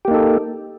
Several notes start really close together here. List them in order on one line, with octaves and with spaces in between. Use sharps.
G4 A#3 D#4 A4